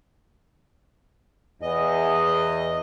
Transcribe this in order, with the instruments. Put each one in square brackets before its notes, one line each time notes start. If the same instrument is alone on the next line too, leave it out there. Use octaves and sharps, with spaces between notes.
[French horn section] E2 [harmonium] D#5